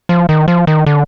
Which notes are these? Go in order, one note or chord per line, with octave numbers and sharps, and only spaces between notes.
F3
D#3
F3
D#3
D3